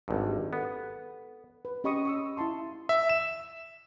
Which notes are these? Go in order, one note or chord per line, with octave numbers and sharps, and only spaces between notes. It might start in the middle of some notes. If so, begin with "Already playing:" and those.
G#1 G2
G4
B3 A4
B4
C#4 G4 D#5 B5 C#6 D#6
C#6 D#6 E6
E4 F5 A5 C6
E5
E7